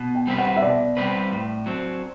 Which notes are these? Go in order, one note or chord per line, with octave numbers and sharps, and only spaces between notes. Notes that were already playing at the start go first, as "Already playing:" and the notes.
Already playing: B2
G5
G3 C4 G4 B4
F#5
E5
B2 D5
G3 C4 G4 B4
A2
F#3 C4